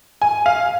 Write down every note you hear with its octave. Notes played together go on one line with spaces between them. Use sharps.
G#5
F5